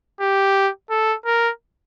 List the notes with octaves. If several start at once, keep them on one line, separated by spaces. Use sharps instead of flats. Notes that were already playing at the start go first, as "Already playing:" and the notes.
G4
A4
A#4